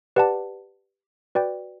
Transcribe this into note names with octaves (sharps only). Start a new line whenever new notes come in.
G4 B4 D5 F#5 A5
F#4 B4 D5 G5